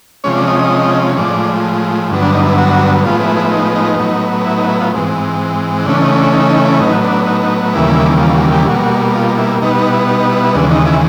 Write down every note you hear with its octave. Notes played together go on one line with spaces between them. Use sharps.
C3 F3 G#3 C#4 C#5
D5
D#5
D#5
A2 F3 G#3 D5
G2 D3 F#3 B3
D4
D#4
E4
F#4
A2 F3 G#3 B3 F4
E4
E4
D#4
D#4
A2 F#3 B3
E4
D#4
E4
F4
G#2 E3 G#3 C4
C#3 E3 A3 C#4 D4
D#4
D4
D#4
D#4
E4
A2 F#3 B3 D#4
D4
D#4
D#4
D#2 C#3 E3 G3 A#3 E4
F4
F#4
G4
B2 G3 A#3 F#4
F4
E4
B2 G3 B3 D#4
D#4
E4
D#4
D#4
E4
E4
D#2 C#3 E3 G#3 D4
D#4
E4